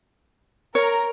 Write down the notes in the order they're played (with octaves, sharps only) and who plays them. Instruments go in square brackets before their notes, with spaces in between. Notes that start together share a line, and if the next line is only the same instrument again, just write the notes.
[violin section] A#4 [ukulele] C#5